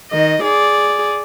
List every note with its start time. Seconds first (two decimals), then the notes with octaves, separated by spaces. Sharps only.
0.10 D#3 D#5
0.42 G#4 D5